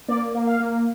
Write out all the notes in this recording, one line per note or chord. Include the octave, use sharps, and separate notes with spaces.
A#3 D5
A#3
F5
A#3